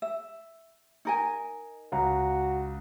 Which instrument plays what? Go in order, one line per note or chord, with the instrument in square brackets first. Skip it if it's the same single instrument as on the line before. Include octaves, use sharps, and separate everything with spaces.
[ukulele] E5
D#4 A#4 G#5
[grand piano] C#2 F5 A#5 [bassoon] F#4